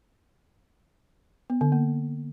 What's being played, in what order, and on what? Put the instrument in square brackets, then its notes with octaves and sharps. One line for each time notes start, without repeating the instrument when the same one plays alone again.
[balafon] B3
D3
A#3